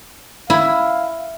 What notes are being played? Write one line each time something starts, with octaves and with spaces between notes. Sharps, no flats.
E4 F5